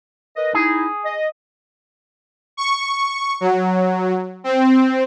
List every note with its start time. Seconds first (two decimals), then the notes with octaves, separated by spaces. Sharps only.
0.36 A#4 B4 D#5
0.54 D#4 E4 G#4
1.05 D#5
2.57 C#6
3.41 F#3
4.44 C4